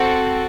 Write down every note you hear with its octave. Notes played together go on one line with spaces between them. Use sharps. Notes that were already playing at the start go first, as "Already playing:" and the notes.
Already playing: C4 F#4 A4